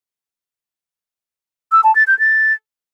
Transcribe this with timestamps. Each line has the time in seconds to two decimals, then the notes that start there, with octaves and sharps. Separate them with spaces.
1.72 E6
1.84 A5
1.96 A6
2.07 G6
2.19 A6